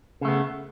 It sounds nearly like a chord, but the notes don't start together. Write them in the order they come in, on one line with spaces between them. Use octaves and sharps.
C#3 A3 B3